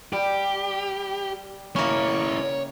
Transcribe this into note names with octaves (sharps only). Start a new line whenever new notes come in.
G3 G4
C#3 A#3 C#4 E4 C#5